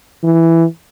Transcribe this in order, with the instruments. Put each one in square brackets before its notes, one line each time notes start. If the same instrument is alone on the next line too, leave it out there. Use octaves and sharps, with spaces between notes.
[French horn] E3